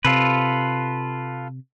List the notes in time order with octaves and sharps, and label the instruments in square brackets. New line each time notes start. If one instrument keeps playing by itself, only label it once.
[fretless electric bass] C3 [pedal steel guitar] F4 A4 B4